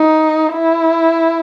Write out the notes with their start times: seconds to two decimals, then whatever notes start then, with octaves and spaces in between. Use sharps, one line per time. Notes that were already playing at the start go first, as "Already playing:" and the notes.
Already playing: D#4
0.54 E4